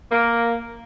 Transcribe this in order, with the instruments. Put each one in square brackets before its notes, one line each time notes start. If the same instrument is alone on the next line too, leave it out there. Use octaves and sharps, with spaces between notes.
[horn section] A#3